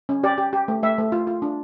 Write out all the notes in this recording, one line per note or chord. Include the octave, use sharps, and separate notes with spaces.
C#4
G4 D5
G4
G4
A3
A3 E5
A3
F4
F4
D4